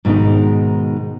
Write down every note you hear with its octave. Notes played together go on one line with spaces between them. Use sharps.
G#2 B2 D#3 G#3 D#4